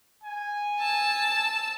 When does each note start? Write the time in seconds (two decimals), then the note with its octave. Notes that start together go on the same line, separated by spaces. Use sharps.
0.24 G#5
0.79 A5 E6